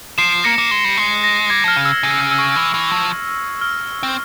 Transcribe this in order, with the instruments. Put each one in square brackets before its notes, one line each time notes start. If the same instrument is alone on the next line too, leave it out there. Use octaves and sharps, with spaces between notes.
[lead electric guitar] F3 [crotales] C7 E7
[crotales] C7
[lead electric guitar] A#3 [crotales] A#6 C#7
[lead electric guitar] A#3
G#3
G3
[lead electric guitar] G#3 [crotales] C7
[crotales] A#6
[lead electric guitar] G3 [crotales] G#6
[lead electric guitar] F3 [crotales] F6
[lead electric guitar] C#3
[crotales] E6
[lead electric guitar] C#3
[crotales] E6
E6
C#6
[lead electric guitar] E3
E3
F3
[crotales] F6
[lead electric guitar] C4